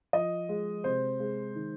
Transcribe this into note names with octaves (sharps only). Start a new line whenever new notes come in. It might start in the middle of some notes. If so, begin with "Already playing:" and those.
F3 D#5
G#3
C3 C5
G#3
D#3